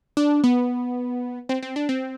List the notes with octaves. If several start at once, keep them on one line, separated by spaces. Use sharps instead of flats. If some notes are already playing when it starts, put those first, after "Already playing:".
D4
B3
C4
C4
D4
C4